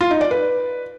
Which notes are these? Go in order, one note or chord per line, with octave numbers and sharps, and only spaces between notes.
F4
D#4
D5
B4